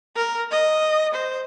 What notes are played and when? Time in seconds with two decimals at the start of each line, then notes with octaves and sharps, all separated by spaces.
0.16 A#4
0.51 D#5
1.14 C5